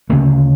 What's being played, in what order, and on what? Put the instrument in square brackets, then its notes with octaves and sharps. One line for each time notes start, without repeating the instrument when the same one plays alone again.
[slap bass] D2 C#3 A3